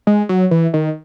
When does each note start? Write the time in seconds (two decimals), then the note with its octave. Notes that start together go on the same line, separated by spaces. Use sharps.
0.07 G#3
0.29 F#3
0.51 E3
0.74 D#3